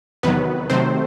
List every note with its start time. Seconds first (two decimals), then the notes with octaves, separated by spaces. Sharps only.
0.23 E2 C3 D#3 F#3 B3 B4
0.70 C3 D#3 F#3 A3 C4 C5